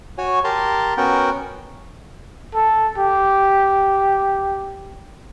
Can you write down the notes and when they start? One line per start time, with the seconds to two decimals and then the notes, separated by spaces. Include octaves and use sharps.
0.18 F#4 C#5 G#5
0.44 G4 A#4 A5 A#5 C6
0.97 B3 C#4 F#4 A#4 F#5 G5
2.54 A4
2.98 G4